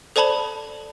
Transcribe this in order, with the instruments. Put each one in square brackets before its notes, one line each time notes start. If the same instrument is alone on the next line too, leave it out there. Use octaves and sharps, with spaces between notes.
[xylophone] A4 C5 D5 A5 B5 F#7